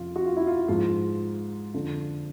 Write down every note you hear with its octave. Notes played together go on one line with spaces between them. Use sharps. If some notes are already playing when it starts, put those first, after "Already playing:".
Already playing: F2 C3 F3 F4
F#4
F4
E4
F4
G#2 F3 F4
F2 D3 F3